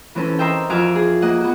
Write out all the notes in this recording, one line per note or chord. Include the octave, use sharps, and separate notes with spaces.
E3 C4 C#4 A4
A#4 C5 D#5 E5 G5
F2 F#4 E5 G#5 D6 F6
G#4
A#3 D#5 F#5
B3 F#4